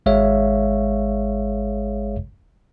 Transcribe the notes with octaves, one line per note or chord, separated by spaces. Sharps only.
G#1 G#3 G#4 C#5 E5 F5